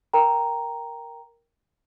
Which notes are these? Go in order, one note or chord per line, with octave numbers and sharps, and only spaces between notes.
A#4 G5 A#5